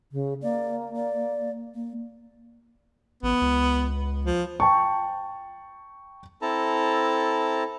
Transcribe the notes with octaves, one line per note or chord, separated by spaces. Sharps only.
C#3
A#3 D5
D5
A#3
A1 B3
C#2
F3
G5 A5 C#6
C4 E4 A4 A5 A#5